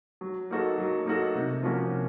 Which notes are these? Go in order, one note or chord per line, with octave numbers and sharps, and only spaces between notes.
F#3
A#3 D#4 F#4 A4
F#3
A#3 D#4 F#4 A4
C3
F3 A#3 C#4 F#4
C3